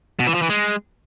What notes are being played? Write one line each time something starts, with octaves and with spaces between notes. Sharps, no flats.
B2
E3
F3
E3
G#3